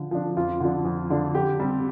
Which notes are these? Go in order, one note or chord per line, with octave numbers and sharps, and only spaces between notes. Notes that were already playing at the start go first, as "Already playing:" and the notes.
Already playing: D3 F3
F3 D4
F2 F4
D3 F3 D4
F2
D3 F3 D4
D3 G4
G3 C4